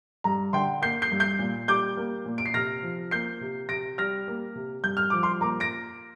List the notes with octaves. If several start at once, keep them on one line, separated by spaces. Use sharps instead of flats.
G2 A#5
D3 G5 C6
A#3 G6 C7
G6 C7
G2
G6 C7
A#2
G3 D6 G6
A#3
A#2
D7
C7
C3 F6 A#6
F3
A#3 G6 C7
C3
C3 A#6 D7
G3 F6 A#6
A#3
C3
G2 G6
F6
F3 D6
C6 F6
A#3 A#5 D6
A#6 D7